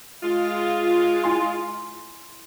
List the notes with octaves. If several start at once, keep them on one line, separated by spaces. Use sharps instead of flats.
G#3 F4
E4 G#5 C6